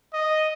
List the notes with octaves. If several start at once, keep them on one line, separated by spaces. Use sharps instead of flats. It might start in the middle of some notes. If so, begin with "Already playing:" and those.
D#5